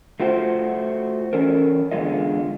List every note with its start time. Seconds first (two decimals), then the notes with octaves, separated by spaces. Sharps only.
0.20 A3 F4 F#4 C5 G5
1.33 E3 C#4 A4 A#4
1.91 E2 D3 E3 G#3 F4 D#5